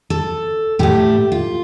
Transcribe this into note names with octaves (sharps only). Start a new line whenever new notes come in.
A4
A2 A3 G4
F4